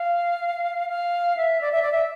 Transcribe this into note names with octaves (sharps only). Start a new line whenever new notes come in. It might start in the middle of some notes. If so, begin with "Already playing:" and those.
Already playing: F5
F5
E5
D5
E5
D5
E5